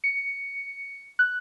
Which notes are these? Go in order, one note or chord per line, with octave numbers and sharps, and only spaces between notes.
C#7
F#6